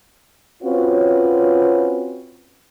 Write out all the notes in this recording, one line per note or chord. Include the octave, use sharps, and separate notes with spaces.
C4 C#4 F4 F#4 B4 C#5